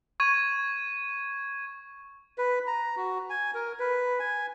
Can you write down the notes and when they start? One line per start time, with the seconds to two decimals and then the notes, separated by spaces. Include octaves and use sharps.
0.20 C#6 G#6 D#7
2.38 B4
2.67 A#5
2.97 F#4
3.30 G#5
3.54 A#4
3.79 B4
4.19 G#5